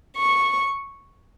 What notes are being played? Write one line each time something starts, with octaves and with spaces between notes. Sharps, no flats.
C#6